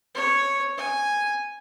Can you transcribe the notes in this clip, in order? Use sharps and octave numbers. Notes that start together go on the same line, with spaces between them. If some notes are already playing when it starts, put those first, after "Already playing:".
C#5
G#5